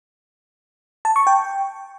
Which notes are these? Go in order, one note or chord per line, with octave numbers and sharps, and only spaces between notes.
A5
C#6
G5